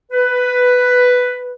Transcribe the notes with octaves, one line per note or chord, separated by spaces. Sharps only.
B4